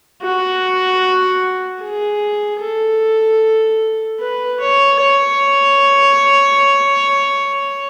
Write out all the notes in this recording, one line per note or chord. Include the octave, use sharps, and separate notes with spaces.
F#4
G#4
A4
B4
C#5
C#5